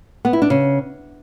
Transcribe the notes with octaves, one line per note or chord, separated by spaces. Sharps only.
B3
E4
D4
C#3